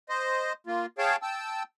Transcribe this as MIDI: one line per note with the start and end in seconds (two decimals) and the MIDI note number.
0.09 0.53 72
0.09 0.53 75
0.67 0.86 58
0.67 0.86 65
0.98 1.16 68
0.98 1.16 73
0.98 1.16 77
0.98 1.16 79
0.98 1.16 81
1.22 1.63 79
1.22 1.63 81
1.22 1.63 88